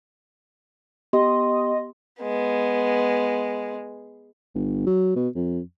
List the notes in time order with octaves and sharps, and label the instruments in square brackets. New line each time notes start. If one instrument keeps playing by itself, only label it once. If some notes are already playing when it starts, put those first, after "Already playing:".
[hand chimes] B3 G4 C6 [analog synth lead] D#5
[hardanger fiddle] G#3 B3
[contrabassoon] G1
F#3
B2
F2